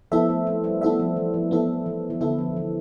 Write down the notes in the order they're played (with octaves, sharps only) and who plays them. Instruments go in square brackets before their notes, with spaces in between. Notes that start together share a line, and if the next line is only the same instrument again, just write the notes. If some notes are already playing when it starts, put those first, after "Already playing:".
[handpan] F3 [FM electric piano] B3 E4 A4 E5
[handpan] A3
A3 C4
G3 B3
[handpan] A3 [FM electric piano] B3 E4 A4 E5
[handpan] F3
E3
F3
[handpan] E3 [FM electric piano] B3 E4 A4 E5
[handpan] E3
E3
[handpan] D3 [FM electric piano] B3 E4 A4 E5
[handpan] F3
E3